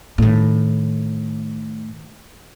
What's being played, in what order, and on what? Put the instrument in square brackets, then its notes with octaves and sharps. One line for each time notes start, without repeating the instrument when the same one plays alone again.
[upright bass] A2 D#3